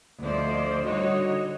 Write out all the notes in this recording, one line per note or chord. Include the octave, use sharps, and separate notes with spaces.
D2 F3 C5 D5 D#5
D3 G3 D#4 F#4 C#5 D#5